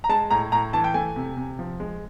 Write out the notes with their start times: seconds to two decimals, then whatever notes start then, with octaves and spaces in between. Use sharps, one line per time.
0.04 A#5
0.09 G#3 A5
0.30 A2 A#5
0.52 A2 A#5
0.73 E3 A5
0.84 G5
0.94 A3 G#5
1.16 C3
1.37 C3
1.59 F3
1.80 G#3